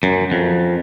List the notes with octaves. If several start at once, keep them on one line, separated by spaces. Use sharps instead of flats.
F#2
F2